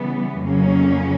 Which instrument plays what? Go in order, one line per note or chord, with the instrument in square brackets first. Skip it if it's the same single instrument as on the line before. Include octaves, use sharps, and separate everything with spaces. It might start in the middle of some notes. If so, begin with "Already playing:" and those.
Already playing: [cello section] C#3 E3 G3 B3
F2 C#3 F#3 A#3 C#4